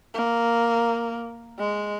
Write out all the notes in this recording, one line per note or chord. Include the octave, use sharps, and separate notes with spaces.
A#3
G#3